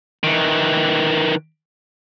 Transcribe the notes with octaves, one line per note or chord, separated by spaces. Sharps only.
D#3 E3